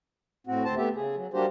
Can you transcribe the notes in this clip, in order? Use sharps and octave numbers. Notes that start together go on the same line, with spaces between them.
A2 C4 F#4
D2 C4 C5 A5
A3 B3 G4 E5
C#3 G#4
F#3
G3 A#3 D4 F#4 G4 C5